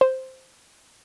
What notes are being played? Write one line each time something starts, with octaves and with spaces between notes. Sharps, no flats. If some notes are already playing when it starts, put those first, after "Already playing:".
C5